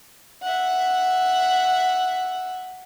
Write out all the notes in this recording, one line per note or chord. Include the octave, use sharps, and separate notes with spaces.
E5 F#5